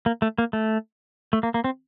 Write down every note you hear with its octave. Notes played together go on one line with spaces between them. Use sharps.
A#3
A3
A#3
A3
A3
A#3
A#3
C4